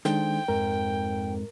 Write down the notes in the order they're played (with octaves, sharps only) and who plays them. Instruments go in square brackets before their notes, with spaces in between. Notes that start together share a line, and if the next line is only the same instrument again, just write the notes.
[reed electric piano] D#3 G#3 D4 [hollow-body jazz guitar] D#4 A4 C5 [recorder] G5
[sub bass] F2 [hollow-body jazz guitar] G#2 [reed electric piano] A#4